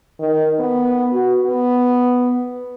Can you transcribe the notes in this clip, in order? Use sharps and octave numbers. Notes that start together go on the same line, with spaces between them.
D#3
B3
F#4
B3